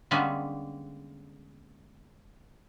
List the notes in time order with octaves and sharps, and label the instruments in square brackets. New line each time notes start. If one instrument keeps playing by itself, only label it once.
[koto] D3 G3 G#3 A#3 B3 C#4